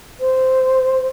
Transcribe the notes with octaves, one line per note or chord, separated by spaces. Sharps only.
C5